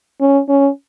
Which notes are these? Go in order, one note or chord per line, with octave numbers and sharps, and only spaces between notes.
C#4
C#4